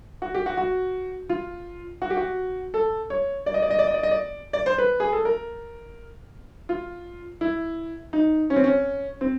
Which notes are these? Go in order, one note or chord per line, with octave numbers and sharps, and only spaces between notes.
F#4
G4
F#4
F#4
F4
F#4
G4
F#4
A4
C#5
D5
D#5
D5
D#5
D5
D#5
D5
D#5
D5
D5
C5
B4
G#4
A4
A#4
F4
E4
D#4
C#4
C4
C#4
C4